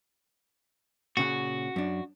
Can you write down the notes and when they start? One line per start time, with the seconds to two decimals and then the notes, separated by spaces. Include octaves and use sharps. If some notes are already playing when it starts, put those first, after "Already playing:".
1.17 A#2 C#3 F#4 F#5
1.76 F#2 D4